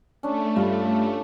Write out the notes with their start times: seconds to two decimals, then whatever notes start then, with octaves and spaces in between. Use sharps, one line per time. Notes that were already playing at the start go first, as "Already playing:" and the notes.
0.23 A3 C#4 D4
0.56 G2 F4 A5 B5